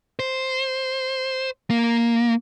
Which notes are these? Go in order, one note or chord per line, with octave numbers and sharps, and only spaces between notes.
C5
A#3